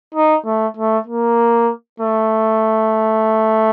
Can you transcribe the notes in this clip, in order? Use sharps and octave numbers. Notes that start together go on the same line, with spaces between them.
D#4
A3
A3
A#3
A3